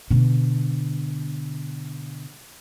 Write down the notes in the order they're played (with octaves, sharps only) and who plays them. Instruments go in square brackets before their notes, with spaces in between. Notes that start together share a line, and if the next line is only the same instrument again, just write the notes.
[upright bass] B2 D3